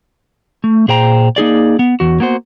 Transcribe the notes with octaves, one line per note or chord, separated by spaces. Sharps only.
A3
A#2 G#4 C5 G5 A#5
A#3 D#4 G#4 D5
B3
E2 F#4
A#3 B3 F#4 C5